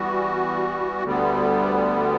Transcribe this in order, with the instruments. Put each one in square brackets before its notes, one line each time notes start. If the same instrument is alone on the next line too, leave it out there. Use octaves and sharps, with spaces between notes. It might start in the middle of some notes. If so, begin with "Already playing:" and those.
Already playing: [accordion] E3 G3 B3 F#4
D2 D3 G3 B3